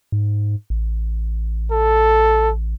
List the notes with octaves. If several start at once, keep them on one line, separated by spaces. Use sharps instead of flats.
G#2
A1
A4